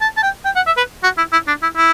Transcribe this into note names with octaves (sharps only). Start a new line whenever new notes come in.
A5
A5
G5
G5
F#5
E5
B4
F#4
E4
E4
D4
E4
E4